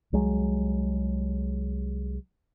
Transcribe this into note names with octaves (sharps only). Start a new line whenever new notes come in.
C2 F#3 G#3